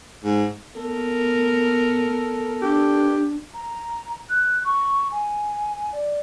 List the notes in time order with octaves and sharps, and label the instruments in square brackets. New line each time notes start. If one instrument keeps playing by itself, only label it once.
[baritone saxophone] G#2
[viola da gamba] B3 A#4 [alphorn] A4
[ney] D4 [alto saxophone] G4
[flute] A#5
F#6
C#6
G#5
D5